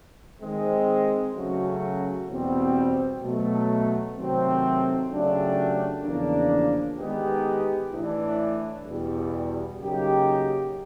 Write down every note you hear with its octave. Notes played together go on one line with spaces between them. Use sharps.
D#3 G#3 C4
C#3 F#3 A3 C#4 F#4
E2 B2 G3 C4
B2 F#3 A3
C3 D#3 F#3 A3 C4
C#3 F#3 A3 D4 G4
E2 C#3 F3 A#3 D4
D#3 G#3 B3 D#4 G4
A2 E3 A3 D4
E2 B2 G3
C#3 F#3 A#3 D#4 G4